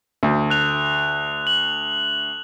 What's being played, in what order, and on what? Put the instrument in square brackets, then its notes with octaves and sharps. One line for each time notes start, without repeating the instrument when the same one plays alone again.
[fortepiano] D2
[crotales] F#6 F7
F#7